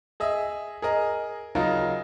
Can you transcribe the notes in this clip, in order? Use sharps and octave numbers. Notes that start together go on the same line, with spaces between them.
G#4 D#5 E5
G#4 A#4 D#5
C#3 F#3 D#4 F4 A#4